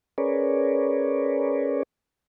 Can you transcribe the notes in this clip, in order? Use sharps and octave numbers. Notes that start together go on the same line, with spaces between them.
C#4 G#4 A#4 B4 C#5 D5